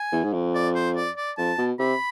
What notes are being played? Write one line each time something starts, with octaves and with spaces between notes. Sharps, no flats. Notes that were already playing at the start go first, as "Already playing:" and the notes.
Already playing: G#5
E2
G#2
F2
D5
C5
D5
D5
F2 A5
B2
C3 B5